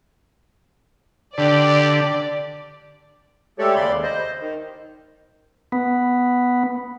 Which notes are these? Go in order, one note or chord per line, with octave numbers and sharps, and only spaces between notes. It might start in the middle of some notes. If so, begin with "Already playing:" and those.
D3 G4 D5
G#3 A3 G4 A4 C#5 D5
D#2 C#3 D5 B5 C6
C5 D#5
D#3
B3